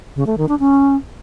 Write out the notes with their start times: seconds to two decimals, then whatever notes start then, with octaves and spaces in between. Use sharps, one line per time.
0.16 C#3
0.27 A3
0.38 D#3
0.49 D4
0.60 C#4